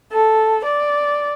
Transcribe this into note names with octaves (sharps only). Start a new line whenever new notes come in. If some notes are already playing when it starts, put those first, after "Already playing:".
A4
D5